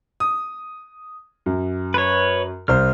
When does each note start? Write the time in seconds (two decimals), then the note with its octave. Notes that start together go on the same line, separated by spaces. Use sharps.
0.20 D#6
1.46 F#2
1.94 B4 C#5
2.68 C2 C5 F6